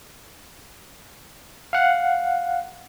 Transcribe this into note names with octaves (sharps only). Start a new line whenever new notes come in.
F5 F#5